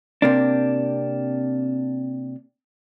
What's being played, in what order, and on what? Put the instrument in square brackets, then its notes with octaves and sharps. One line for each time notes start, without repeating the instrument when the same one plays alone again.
[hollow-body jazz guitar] C3 A#3 D4